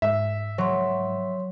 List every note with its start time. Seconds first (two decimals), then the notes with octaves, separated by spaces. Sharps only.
0.02 G#2 E5
0.58 F#3 C#5 C6